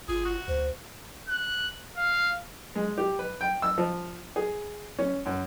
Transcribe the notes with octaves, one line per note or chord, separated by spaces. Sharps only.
G1 F4 G#4
F#4
D2 C5
F#6
F5
G#3
G4
B4
G5
E6
F3
G#4
C#4
F#2